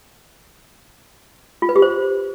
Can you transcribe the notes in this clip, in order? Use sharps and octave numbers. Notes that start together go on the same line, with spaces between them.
F4
B4
G4
C5